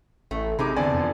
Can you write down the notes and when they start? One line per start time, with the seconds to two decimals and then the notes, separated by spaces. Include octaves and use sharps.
0.31 A1 A3
0.59 F#2 C3 D#4 G#4 B5 D6
0.76 E2 D3 D5 G#5
0.94 F2